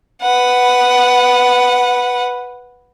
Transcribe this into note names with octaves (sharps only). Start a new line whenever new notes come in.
B4 F#5